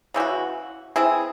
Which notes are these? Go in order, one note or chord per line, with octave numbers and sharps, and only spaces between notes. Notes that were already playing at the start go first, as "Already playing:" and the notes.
C#3 E3 C4
F#4
E3 C4 E4 G#4